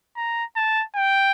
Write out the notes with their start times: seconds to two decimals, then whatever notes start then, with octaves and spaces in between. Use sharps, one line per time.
0.17 A#5
0.56 A5
0.96 G5